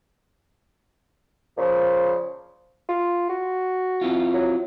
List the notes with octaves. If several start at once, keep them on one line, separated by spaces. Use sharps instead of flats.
A#2 C#3 F3
F4
F#4
C4 E4 F4
F#3